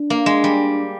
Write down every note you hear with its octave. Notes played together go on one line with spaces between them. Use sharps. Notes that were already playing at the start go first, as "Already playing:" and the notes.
Already playing: D4
A#3
G#3
G3